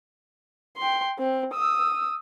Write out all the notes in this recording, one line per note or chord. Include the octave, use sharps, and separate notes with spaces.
G5 C6
C4
D#6 E6